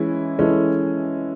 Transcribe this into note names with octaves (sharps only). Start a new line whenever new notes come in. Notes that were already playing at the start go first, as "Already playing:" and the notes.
Already playing: E3 G#3 C#4 E4
E3 G#3 C#4 E4 A4